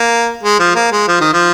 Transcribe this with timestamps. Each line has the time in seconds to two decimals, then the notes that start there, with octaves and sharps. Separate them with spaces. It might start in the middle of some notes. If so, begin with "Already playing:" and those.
Already playing: A#3
0.43 G#3
0.59 F3
0.75 A#3
0.91 G#3
1.08 F3
1.20 D#3
1.33 F3